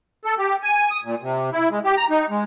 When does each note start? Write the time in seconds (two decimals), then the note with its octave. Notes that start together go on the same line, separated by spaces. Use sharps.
0.25 A4
0.38 G4
0.63 G#5
0.91 D#6
1.04 A#2
1.22 C3
1.52 E4
1.71 G#3
1.84 G4
1.97 A#5
2.10 D#4
2.30 G#3